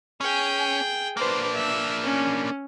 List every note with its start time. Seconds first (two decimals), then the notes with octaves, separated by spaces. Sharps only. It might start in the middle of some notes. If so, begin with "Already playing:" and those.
0.21 C#4 G#4 G5
1.17 A#3 D4 B4 C5
1.54 E5
2.03 C#4